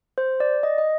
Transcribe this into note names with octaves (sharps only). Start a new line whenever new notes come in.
C5
D5
D#5
D#5